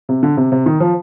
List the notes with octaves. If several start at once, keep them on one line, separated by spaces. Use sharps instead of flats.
C3
D3
C3
C3
D#3
F3